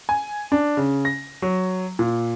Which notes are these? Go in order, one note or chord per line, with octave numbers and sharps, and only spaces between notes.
G#5
D4
C#3
A#6
F#3
A#2